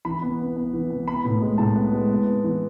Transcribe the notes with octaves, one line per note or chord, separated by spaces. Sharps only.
E3 B5
B3
B3
B3
E3
B3
B3 B5
A2
G#3
A2 A5
B3
G#3
B3
B3
E3